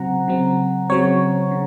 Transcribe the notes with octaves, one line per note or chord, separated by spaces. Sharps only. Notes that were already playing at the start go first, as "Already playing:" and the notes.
Already playing: C#3 F#3 C4 F#5 A#5
C#3 F#3 C4
C#3 F#3 C4 C#5
C#3